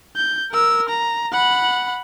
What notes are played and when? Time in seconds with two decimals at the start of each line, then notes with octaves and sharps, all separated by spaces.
0.16 G6
0.52 A#4 E6
0.89 A#5
1.33 F#5 B5